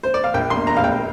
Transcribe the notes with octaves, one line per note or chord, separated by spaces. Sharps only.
C5
D5
F5
A#1 G5
C6
A#3
A#5
A#1 F5
G5